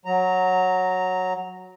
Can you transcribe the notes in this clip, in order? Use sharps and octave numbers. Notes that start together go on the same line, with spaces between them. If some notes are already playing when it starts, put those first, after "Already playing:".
F#3 A#5